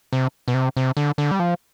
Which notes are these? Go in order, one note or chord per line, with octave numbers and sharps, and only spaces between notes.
C3
B2
C3
C3
D3
D3
G3
F3